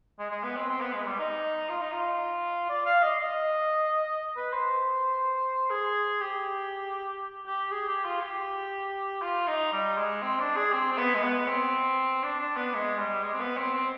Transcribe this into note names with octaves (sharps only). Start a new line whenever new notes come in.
G#3
G#3
B3
C4
C4
B3
G#3
G3
D#4
F4
D#4
F4
D5
F5
D#5
D#5
B4
C5
G#4
G4
G4
G#4
G4
F4
G4
F4
D#4
G3
G#3
C4
D4
G#4
C4
C4
B3
G#3
B3
C4
D4
D4
B3
G#3
G3
G#3
C4
B3
C4
C4